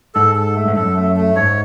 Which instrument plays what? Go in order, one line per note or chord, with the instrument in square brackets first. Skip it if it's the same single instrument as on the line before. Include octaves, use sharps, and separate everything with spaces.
[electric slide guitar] G#2 [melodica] A4
[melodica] A4
A3
[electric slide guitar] G#2
[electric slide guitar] F#2 [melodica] A4
[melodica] A3
A3
[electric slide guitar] G#2 [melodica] C#5